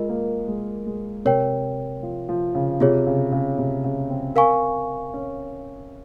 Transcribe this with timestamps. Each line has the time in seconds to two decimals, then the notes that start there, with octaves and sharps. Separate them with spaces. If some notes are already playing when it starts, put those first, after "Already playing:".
Already playing: G#3 F4 A#4 D#5
0.09 A#3
0.48 G#3
0.87 G#3
1.25 C3 A#4 C#5 G5
2.03 F3
2.29 F3
2.55 C#3
2.80 C3 F4 G#4 C#5
3.07 C#3
3.32 C#3
3.59 C3
3.84 C#3
4.10 C4
4.36 A#4 F5 G#5 C#6
5.14 C#4